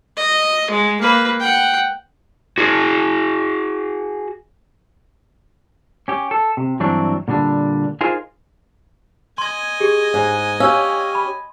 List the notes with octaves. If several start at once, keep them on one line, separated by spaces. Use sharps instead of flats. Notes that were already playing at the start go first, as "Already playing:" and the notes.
D#5
G#3
A#3 B4
F#5 G5
F#4 G#4
C#4 G4
A4
C3
G2 E3 F#3 C4 D4
A#2 D3 G3 D4
D#4 F4 G#4 A#4 C5 D#5
D#5 G#5 C6 G#6
G4 G#4
G#2
C#4 G4 F5 E6
B5